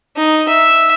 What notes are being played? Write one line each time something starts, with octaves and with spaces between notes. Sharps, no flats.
D#4
E5